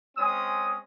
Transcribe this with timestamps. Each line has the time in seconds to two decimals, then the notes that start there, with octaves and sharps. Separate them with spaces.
0.18 G#3 C4 C#4 D#6